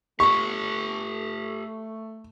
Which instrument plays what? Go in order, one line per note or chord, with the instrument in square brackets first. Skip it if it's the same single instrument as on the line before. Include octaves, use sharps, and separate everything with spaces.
[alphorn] A3 [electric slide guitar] G4 A4 [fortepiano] C#6